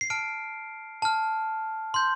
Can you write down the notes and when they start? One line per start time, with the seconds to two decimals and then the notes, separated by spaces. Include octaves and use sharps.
0.01 C7
0.10 A5 F6 D7
1.02 A5 F6
1.94 C6 G6